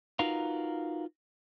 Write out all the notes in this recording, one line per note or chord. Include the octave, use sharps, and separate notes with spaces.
D#4 F4 F#4 A#4 B4 F5